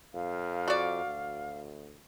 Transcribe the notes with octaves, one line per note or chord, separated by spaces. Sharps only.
F2 F5
F#4 D5
D2